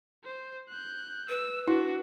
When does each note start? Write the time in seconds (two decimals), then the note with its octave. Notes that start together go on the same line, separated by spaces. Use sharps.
0.24 C5
0.69 F#6 G6
1.29 B4 E6
1.68 D4 E4 F#4